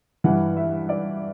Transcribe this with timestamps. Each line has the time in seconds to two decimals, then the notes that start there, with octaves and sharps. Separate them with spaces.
0.24 G2 E3 F#5
0.56 E5
0.89 D5